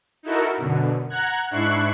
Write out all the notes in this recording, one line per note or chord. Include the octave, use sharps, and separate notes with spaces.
D#4 E4 F#4 A4 A#4
F#2 B2 D3
F#5 A#5 F#6 G#6
G#2 D4 E4 C#6 F#6 C7